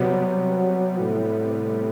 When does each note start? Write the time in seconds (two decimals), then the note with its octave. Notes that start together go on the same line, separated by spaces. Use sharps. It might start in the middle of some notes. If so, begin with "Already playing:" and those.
Already playing: C3 F#3 G3 B3
0.99 A2